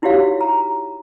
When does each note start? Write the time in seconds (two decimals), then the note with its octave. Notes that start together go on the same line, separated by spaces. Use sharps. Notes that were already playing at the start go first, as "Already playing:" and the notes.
0.02 D#4 E4 F#4 G4 C#5 F5
0.41 A#5